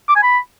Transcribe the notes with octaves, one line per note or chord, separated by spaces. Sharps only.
D6
G#5
B5